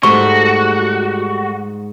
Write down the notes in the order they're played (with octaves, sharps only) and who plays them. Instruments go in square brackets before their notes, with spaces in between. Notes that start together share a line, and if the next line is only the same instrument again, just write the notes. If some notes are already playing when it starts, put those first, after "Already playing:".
[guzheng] G#2 [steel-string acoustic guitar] G3 A3 [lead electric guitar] F#4 [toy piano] C#6